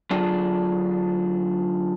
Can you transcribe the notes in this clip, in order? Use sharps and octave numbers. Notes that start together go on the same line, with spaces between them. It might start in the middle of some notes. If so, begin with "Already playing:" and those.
D3 F#3 D4 F4 G#4